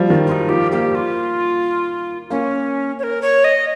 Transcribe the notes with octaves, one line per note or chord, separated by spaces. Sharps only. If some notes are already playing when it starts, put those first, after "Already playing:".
Already playing: F3 G3
D#3
F4
D#4
F3 G4
A#3 G4
F4
A#3 C#4
C#5
A#4
C#5
D#5